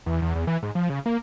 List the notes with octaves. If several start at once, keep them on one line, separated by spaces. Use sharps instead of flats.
E2
E2
E2
E3
G#2
F3
C#3
A#3